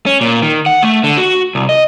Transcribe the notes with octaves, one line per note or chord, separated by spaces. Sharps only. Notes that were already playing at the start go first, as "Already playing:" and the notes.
C#4
A#2
D#3
F#5
A3
D3
F#4
C2
D#5